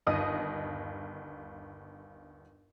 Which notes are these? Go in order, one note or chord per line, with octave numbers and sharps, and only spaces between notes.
G1 D#2 D#5 D#6 D#7